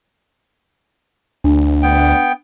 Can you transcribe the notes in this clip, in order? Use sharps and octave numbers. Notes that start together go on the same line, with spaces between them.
D2 D4
B3 G5